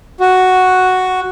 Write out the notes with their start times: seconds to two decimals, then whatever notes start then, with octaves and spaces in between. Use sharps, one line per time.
0.20 F#4